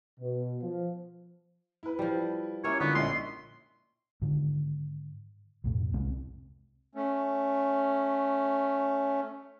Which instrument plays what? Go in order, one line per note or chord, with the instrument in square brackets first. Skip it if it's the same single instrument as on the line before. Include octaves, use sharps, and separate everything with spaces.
[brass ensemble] B2
F3
[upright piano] E4 B4
[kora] F3 G3
[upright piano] G3 [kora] A#3 C#4 E4 [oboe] C#5
[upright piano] D3 F4 [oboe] B3 [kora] C#5 E5
[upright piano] A#1 D#5 [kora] C#4 E4 [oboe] C6
[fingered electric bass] G#2 D3 D#3
B1 F2 A2
C2 C3 G#3 C4
[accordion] A3 C#4